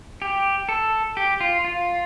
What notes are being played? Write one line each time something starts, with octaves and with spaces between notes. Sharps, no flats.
G4
A4
G4
F4
F4